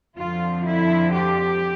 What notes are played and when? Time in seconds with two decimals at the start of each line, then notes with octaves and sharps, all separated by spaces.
0.16 F2 D3 F3 F4
0.66 E4
1.14 G4